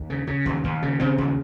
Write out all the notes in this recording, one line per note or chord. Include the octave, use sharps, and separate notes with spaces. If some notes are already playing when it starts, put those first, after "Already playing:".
Already playing: D#2
C#3
C#3
D#2
D#2
C#3
C#3 C4
D#2